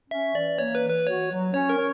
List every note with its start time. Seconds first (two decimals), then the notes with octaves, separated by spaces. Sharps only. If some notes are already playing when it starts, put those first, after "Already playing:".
0.10 C#4 E5
0.35 E3 D5
0.58 A#3 C#5
0.75 B4
0.82 E3
0.90 B4
1.05 F#4 C#5
1.30 F#3
1.53 C#4 C#5
1.69 A#4
1.77 C#5